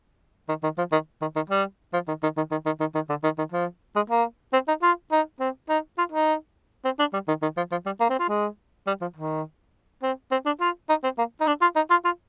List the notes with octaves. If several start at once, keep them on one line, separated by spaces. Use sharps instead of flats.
D#3
D#3
F3
D#3
D#3
D#3
G3
F3
D#3
D#3
D#3
D#3
D#3
D#3
D#3
D3
D#3
D#3
F3
G#3
A#3
C4
D#4
F4
D#4
C4
D#4
F4
D#4
C4
D4
G3
D#3
D#3
F3
F3
G3
A#3
C4
F4
G#3
G3
F3
D#3
C4
C4
D4
F4
D#4
C4
A#3
D#4
D4
F4
D#4
F4
F4